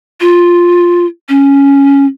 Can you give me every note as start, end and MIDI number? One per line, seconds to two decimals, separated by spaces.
0.21 1.06 65
1.29 2.05 61